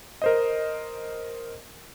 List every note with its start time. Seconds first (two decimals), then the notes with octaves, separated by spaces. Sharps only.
0.22 A#4 C5 D#5